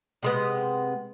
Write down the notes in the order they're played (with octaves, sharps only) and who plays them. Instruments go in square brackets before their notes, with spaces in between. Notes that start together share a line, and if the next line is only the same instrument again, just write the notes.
[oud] C3 G#3 B3